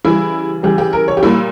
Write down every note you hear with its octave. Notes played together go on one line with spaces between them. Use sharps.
C#3 E3 G3 E4
C#3 E3 G3 G4
G4
A#4
C#5
G4
A#2 G3 E4